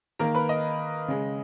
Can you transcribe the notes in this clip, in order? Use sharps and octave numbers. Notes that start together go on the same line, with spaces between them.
D#3 A#3 A#4 A#5
B4 B5
D#5 D#6
C#3 G#3